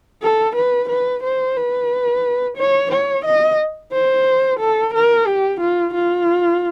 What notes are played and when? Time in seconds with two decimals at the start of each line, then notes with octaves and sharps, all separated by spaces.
0.23 A4
0.56 B4
0.90 B4
1.23 C5
1.56 B4
2.58 C#5
2.92 C#5
3.25 D#5
3.93 C5
4.60 A4
4.94 A#4
5.27 G4
5.61 F4
5.94 F4